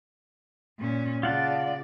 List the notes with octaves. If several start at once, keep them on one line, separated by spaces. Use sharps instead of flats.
A#2 C#4
C#3 F4 D5 F#5 A5